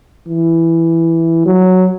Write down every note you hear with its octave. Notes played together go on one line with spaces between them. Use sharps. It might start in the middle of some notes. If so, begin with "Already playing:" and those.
E3
F#3